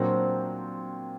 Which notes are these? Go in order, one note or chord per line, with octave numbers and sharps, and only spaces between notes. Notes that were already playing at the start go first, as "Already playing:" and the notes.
Already playing: A#2 F#3 A#3 C4 D4 F#4